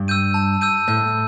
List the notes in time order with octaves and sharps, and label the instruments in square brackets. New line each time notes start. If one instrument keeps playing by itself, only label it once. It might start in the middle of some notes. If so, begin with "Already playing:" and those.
Already playing: [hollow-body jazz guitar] G2
[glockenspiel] E6 G6 D#7
A5
E6 G6 D#7
[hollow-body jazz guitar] A2 [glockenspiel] G6